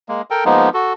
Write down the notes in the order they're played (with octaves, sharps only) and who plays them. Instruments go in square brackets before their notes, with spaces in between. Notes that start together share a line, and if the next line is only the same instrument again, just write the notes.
[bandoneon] G#3 A#3
A4 A#4 G5
F3 G#3 A#3 B3 D#4
F#4 A4